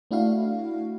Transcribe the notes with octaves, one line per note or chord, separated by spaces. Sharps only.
A3 D4 E4 F#4 F5